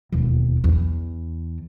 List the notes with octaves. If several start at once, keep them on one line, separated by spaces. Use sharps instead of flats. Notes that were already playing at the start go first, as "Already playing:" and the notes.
E1 D#2
E2